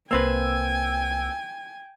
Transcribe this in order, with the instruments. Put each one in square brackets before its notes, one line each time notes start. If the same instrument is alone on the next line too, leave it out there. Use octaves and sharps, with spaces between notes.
[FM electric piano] C2 E6 [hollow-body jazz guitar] A#3 C4 B4 [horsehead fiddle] G5 [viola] G#5